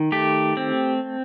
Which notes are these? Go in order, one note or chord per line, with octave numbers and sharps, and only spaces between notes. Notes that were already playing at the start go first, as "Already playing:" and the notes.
Already playing: D#3
A3 G4
C4